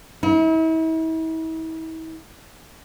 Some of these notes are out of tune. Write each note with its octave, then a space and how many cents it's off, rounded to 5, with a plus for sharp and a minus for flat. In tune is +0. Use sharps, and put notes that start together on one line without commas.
E4 -40